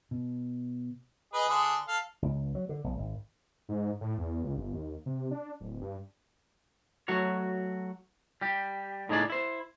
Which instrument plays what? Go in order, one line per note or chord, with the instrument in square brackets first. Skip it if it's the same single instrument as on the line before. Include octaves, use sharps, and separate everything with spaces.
[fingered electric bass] B2
[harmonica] G#4 B4 D#5
D3 G#4 D#6
A4 F5
[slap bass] C#2
F#3
D3
B1
G#1
[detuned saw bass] G#2
A2
E2
C#2
G1
D#2
C3
D4
D1
G2
[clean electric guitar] F#3 A3 F#4 C#5
G3 G4
A2 D#4 G#4 D5
E4 C5